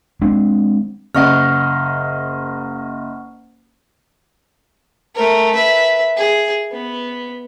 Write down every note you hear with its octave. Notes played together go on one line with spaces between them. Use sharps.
G#3 C4 D4
F#1 D#5 F#5 C#6 F6
A3 A#4
B4 E5
G#4
B3